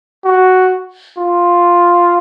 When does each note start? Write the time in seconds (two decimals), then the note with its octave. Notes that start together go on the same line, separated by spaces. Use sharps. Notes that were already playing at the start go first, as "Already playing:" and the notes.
0.25 F#4
1.18 F4